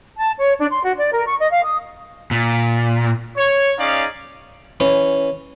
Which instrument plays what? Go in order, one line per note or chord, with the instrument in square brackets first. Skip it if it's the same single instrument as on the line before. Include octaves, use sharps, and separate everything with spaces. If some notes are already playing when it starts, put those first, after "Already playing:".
[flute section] A5
C#5
D4
C6
F#4
D5
A#4
C#6
D#5
F5
D#6
[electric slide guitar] A#2
[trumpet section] C#5
C#4 D#4 G#4 D5 F5
[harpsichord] E3 C#4